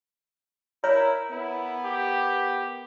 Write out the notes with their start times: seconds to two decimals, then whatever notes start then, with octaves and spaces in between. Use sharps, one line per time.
0.84 E4 A#4 C#5
1.31 B3 E4
1.84 G4